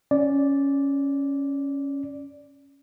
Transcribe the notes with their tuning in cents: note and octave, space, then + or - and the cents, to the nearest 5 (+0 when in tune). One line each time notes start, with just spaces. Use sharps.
C#4 +0 D5 -5